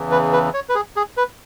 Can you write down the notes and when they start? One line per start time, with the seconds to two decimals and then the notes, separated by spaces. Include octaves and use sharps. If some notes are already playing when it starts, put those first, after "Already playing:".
Already playing: E2 C#3 E3
0.11 B4
0.33 B4
0.54 C#5
0.69 B4
0.75 G#4
0.96 G#4
1.17 B4